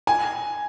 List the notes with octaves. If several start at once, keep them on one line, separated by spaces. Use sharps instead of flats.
G#5